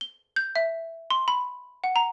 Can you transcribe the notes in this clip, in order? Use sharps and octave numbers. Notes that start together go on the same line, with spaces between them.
G7
G6
E5
C6
B5
F#5
A#5